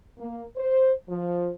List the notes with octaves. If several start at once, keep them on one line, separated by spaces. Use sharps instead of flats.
A#3
C5
F3